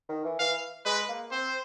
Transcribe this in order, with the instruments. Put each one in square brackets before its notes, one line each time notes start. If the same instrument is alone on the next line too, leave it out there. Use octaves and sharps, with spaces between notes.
[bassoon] D#3
E3
[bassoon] E3 [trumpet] F5
[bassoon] G#3 [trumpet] B4
[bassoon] A#3
[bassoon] C4 [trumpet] C5